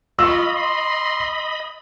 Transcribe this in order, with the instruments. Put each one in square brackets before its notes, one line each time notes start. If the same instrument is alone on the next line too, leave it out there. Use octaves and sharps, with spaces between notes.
[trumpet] F4 [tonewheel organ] D#5 B5 [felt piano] C#6 E6
[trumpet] C6